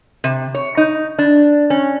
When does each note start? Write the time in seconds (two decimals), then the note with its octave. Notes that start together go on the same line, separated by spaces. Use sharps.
0.24 C3
0.55 C#5
0.77 D#4
1.19 D4
1.70 C#4